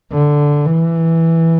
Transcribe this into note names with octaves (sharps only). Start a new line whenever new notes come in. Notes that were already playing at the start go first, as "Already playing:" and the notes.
D3
E3